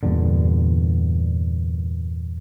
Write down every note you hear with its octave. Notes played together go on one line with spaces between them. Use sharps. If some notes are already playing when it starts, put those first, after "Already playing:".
E2 G2 A#2 D3